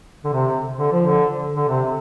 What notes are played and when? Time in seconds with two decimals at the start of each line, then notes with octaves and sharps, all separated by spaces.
0.24 D3
0.33 C3
0.78 D3
0.92 F3
1.06 D3
1.56 D3
1.68 C3